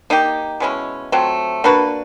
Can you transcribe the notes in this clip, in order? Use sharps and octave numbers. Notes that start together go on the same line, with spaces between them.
A#3 D#4 G4
B2 G#3 C#4 E4
F#3 A3 C4 F4
A#3 D4 F#4 B4